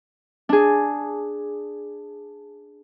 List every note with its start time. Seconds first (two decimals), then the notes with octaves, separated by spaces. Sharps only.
0.49 D4 G#4